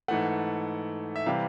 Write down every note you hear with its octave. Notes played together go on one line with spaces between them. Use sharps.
G#2 E3 A3 F#5
E5
C3 E3 G3 F5